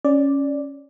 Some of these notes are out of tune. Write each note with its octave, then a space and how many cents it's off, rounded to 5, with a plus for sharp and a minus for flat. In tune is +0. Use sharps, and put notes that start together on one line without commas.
C#4 +0 D5 +0